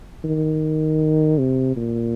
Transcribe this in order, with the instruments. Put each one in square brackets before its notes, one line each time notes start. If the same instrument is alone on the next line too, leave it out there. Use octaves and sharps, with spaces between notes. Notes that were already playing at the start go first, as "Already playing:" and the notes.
[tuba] D#3
C3
A#2